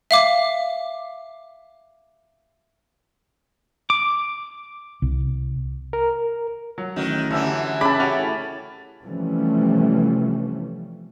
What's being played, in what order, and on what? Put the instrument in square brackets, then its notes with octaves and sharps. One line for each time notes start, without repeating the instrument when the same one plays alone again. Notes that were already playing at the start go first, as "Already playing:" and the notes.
[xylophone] E5 F5 D6
[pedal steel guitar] D6
[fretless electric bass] C2
[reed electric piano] A#4
[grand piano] F#3
[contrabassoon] A1 [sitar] D#3 F#4
[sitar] F#2 E3 G3 [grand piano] D3 E6
[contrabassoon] C#3 [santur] A5 B5 [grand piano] D6
[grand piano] C#4 F#4 G4
[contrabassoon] A2
[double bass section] C3 E3 F3 G3 A3 C#4